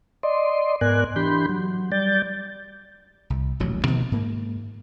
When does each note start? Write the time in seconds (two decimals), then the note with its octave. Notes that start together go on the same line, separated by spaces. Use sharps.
0.23 D5 D#5 C6
0.81 G#2 B3 A#4 D5 G#5 F#6
1.16 E3 D4 G4 B5 C6 G6
1.49 F#3
1.92 G3 D5 G6 A6
3.30 C2
3.60 D#1 A1 B2 F#3
3.86 B2 D#3 F3 A#3
4.12 G#2 A#3